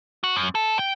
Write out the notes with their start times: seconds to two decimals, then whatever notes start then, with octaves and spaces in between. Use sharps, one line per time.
0.24 F#4
0.36 F#2
0.55 A4
0.79 G5